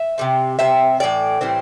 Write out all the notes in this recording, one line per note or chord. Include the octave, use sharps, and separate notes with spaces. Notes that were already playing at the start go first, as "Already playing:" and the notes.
Already playing: E5
C3 G3 C4
C3 G3 C4 E5
A2 E3 D5
A2 E3 G3 C4